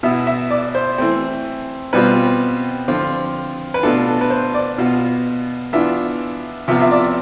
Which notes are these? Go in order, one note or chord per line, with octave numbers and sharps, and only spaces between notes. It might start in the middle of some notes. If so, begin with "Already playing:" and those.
B2 B3 E4 E5
E5
D5
C5
E3 A3 C4
B2 G3 C4 F4 B4
D3 F3 C4 F4
B4
B2 A3 D4 F4 A4
A4
B4
C5
D5
B2 B3 F4
E3 B3 D4 F4 E5
C3 F3 B3 F4 E5
E5
D5